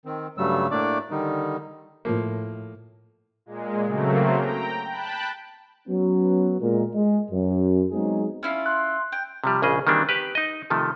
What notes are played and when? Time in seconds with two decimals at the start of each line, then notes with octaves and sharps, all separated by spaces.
0.05 D#3 C4
0.38 G2 C#3 F#3 G3 A3 E6
0.71 A2 A3 A#3 D4 D5 D6
1.10 D3 D#3 G3 D#4
2.05 A2 F3 A#3
3.46 A#2 G#3
3.86 C#3 F#3 A3 A#3 C4
4.37 G5 A#5
4.91 G5 A5 B5 F#6
5.88 F#3 B3 C#4
6.61 A#2 G#3 A#4
6.93 G#3
7.30 F#2
7.91 F#3 G#3 B3 C4 D#4 G#4
8.43 C#4 E4 F4
8.66 C6 F#6
9.12 G5
9.44 C3 F3 G3
9.62 A#1 C#3 G#4 D#5
9.87 D#3 E3 G3 A#3 C4 D4
10.09 G4 B4
10.35 D#4 D#5
10.70 C3 D#3 F3 A3